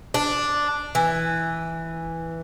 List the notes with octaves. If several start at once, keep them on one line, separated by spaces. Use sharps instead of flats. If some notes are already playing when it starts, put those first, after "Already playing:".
D4
E3